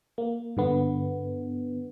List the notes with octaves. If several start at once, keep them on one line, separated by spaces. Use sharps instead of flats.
A#3
G2 D3 B3